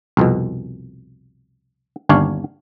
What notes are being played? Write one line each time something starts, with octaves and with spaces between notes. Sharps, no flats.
C2 F2 B2
G1 D#2 C#4 D4 C#5 F5